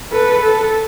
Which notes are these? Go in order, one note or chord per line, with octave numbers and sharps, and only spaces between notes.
A4 B4
A4